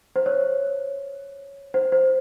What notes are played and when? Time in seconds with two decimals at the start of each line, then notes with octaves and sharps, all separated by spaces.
0.16 C5
0.26 C#5
1.74 C5
1.92 C5